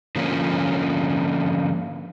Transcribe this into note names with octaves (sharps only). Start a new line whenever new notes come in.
D3 F3 A#3 C#4